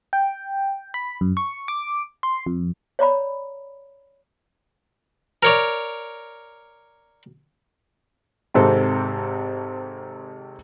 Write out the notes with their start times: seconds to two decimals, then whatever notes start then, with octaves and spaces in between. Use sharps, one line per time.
0.13 G5
0.94 B5
1.21 F#2
1.37 C#6
1.68 D6
2.23 C6
2.46 F2
2.99 C#5 D5 A#5 B5
5.43 A#4 C#5 D5
8.54 G#1 G#2 C3 C4 A4